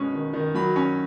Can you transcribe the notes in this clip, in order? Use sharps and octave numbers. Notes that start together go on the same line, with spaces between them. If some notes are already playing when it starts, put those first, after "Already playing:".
Already playing: B2 G#3 C#4
D#3
D#3
F#3 B5
C#4